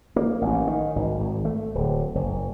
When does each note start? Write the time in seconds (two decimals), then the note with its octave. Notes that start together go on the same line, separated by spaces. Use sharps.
0.16 A#3
0.41 A1
0.67 D#3
0.96 G#1
1.21 G#1
1.45 A3
1.75 D1
2.15 F#1